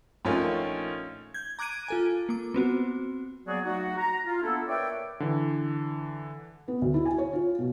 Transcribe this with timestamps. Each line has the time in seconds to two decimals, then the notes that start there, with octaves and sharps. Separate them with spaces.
0.25 A#1 D#3 A3 C#4 F4
1.34 G6 G#6
1.59 A#5 D6 F#6 G#6 D7 D#7
1.88 F4 A4 G#5
2.29 A#3 D6
2.54 B3 C4 F#4
3.47 F#3 A#3 B3 F#4 G#4 D5
3.64 F#3 A3 D#4 F#4
3.98 A#5
4.25 F4
4.42 A#3 B3 D4 E4 A4
4.67 A#4 B4 C#5 D5 E5 G5
5.20 D3 E3
6.68 B3
6.82 D2
6.94 E4
7.06 G#5
7.18 C#5
7.33 F4
7.59 B2